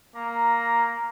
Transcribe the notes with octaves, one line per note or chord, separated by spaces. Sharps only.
A#3 A#5